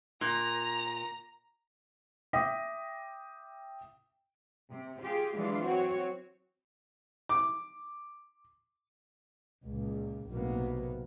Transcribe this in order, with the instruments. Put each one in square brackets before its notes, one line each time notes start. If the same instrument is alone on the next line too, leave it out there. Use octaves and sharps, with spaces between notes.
[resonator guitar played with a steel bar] A#2 [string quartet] A#5
[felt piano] E5 G5 D6 D#6 A#6 B6
[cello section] C3
F4 G4 G#4
E3 F#3 G#3 D4 F4
C4 F#4 C#5
[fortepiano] D6
[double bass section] C#2 A#2
B1 A2 C3 F#3 A#3 B3